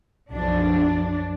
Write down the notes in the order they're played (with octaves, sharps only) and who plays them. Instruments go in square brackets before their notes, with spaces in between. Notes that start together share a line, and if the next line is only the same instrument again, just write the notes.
[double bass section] B1 F3 [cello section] F#2 D4